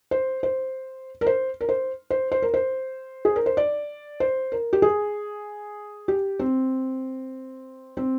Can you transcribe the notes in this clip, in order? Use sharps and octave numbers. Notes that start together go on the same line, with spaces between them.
C5
C5
A#4
C5
A#4
C5
C5
C5
A#4
C5
G#4
A#4
C5
D5
C5
A#4
G4
G#4
G4
C4
C4